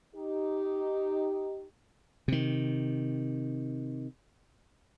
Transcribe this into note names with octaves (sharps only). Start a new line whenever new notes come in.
D#4 G4
C3 D#3